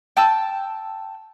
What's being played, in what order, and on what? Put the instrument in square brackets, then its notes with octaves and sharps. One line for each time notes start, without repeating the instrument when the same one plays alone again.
[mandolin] G5 A5 E6